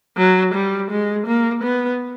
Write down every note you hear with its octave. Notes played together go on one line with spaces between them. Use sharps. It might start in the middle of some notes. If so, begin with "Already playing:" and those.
F#3
G3
G#3
A#3
B3